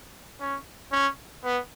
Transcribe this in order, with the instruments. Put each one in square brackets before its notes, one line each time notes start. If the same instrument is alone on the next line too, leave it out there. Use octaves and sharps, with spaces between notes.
[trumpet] C#4
C#4
B3